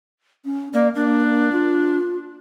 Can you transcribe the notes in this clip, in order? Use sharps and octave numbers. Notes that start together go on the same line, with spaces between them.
C#4
A#3 D5
A#3 D4
F4